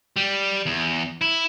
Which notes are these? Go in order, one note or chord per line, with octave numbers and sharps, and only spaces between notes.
G3
E2
E4